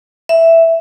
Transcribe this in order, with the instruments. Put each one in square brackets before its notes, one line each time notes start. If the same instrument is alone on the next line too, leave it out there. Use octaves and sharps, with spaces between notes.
[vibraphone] E5